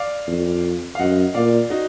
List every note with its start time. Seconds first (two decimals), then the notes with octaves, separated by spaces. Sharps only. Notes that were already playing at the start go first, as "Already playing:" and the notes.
Already playing: D5 F5
0.27 F2
0.95 F5
0.99 F#2 D#5 F#5
1.34 A#2 D5 F5
1.70 D#4 F#4